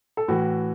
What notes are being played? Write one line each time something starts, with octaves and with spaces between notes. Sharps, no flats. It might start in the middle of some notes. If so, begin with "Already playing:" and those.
A4
A2 E3 F#4